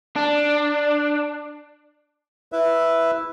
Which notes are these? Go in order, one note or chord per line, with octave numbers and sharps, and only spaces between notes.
D4
E4 B4 E5